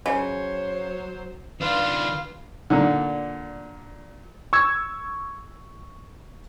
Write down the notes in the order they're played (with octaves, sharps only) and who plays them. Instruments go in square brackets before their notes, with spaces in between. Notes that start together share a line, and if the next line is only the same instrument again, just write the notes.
[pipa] C#3 [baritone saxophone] F#3 [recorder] C5 [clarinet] C#5
[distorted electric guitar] D#3 D4 [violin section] F4 [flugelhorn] B4 [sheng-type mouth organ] F5
[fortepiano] A#2 D3
[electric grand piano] C#6 E6 G#6